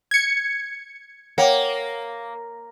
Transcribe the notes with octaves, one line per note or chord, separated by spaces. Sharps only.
G#6 C#7
A#3 C#5 F#5 G5